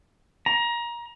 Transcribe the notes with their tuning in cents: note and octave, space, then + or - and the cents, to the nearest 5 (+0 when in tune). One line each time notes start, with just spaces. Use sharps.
A#5 +25